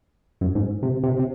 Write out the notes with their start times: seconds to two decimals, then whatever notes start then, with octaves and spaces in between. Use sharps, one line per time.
0.41 F#2
0.55 G#2
0.83 C3
1.04 C3
1.19 C3